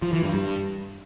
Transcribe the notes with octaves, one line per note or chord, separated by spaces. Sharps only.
F3
E3
G2
G2